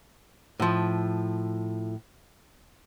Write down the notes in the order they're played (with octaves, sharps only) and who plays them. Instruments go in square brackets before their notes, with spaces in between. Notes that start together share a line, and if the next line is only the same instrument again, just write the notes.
[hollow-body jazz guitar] A2 F3